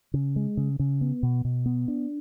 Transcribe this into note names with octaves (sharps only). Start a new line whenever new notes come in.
C#3
G#3
C#3
C#3
B3
B2
B2
B3
D4